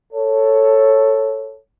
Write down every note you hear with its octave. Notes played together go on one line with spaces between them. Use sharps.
A4 C#5